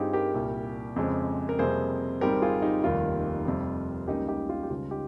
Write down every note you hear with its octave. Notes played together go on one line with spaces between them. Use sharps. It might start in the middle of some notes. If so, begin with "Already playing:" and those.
Already playing: G2 G3 C4 D#4 F4 G4 G#4
G4 A#4
C2 A#2 G3
F2 C#3 G#3 C4
A#4
F2 C3 G3 A#3 G#4 C5
G#1 G#2 G3 C4 G4 A#4
F4 G#4
D#4 G4
F1 D#2 D#3 G3 F4
F2 C3 G3
C#2 C#3 G3 A#3 D#4 G4
D#4 G4
F4
G4
C#2 C#3 G3 F4
D#4 G4